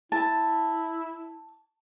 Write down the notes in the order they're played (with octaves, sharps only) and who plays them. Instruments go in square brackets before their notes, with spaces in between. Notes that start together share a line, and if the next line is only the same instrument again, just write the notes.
[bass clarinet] E4 [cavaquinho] A5